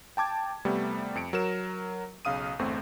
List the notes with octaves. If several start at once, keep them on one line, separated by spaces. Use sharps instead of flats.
G5 A5 D6 G#6
C3 G3 A3 B3
F2 C#7 D7
F#3 A#4 E7
B1 C#3 F5 D#6 D#7
G1 E2 A3 C4